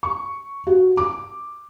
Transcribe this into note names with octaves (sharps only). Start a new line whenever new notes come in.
C#6
F#4
D6